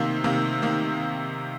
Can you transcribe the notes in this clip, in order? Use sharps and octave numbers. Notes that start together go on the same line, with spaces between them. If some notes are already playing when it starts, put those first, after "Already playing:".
Already playing: C3 D#3 A#3
C3 D#3 A#3
D#3 A#3